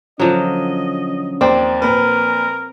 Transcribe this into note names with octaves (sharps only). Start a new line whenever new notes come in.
D3 F3 F#3 C#4 D#5
D#2 C4 D5
A#2 A#4 B4